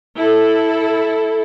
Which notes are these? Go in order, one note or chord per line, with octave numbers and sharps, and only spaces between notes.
E4 A4